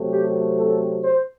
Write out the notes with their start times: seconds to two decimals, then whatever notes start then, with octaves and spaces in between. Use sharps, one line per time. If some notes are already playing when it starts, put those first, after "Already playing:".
Already playing: C3 F#3 A3 C4
0.12 G4
0.58 A4
1.04 C5